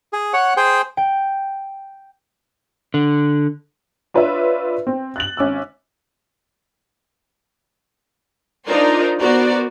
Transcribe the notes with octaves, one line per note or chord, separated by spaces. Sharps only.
G#4
C#5 F#5
G#4 C5 G5
G5
D3
D4 F4 B4 C#5 D5 E5
C4
F#6 A6 F#7
G#1 C#4 D6 E6
D4 D#4 F4 A#4 C5 D5
B3 F#4 A#4 C5 D5